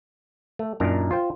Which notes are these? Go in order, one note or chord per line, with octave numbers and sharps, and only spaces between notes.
A3
F#2 A#2 D4 D#4 A#4 A#5
F4 C5 G5